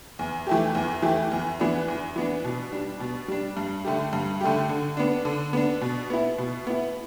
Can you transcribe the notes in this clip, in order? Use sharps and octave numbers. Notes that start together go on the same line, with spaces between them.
E2
E3 A3 G4
E2
E3 A3 G4
E2
E3 B3 D4
E2
E3 B3 D4
B2
G3 D4
B2
G3 D4
G2
D3 A3 G4
G2
D3 A3 G4
D3
B3 D4
D3
B3 D4
B2
B3 E4
B2
B3 E4